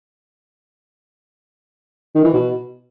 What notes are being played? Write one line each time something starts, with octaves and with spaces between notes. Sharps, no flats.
D#3
E3
B2